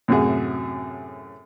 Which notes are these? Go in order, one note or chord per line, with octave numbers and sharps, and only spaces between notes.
F#2 A2 C3 F#4 G#4